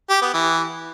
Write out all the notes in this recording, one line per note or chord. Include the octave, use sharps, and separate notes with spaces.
G4
B3
E3